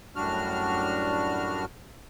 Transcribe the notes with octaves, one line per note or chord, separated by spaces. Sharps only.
F#2 A2 G3 D4 F#4 F6